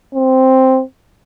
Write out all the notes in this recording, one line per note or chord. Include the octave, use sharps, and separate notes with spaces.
C4